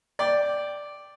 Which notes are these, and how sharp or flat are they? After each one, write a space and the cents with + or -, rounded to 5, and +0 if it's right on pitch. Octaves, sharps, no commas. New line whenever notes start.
D5 +0 G5 +0